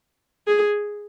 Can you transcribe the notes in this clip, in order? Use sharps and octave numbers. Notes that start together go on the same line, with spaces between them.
G#4